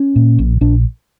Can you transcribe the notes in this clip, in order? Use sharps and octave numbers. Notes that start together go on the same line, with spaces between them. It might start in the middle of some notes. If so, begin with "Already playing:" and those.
Already playing: C#4
A#2
A#1
A#1 D4